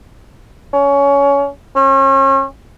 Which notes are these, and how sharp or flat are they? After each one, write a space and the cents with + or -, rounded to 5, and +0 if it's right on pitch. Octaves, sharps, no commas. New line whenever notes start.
C#4 +20
C#4 -35